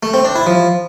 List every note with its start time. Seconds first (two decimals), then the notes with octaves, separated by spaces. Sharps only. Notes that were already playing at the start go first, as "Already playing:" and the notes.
0.03 A3
0.14 C4
0.25 D4
0.36 E4
0.47 F3